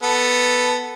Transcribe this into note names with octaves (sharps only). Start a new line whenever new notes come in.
B3 A4